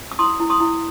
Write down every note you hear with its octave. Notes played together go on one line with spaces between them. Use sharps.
E6
E4 C6 D#6
E4
C6 D#6
E4